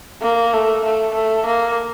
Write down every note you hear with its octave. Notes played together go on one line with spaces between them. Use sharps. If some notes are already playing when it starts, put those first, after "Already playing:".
A#3
A3
A3
A3
A#3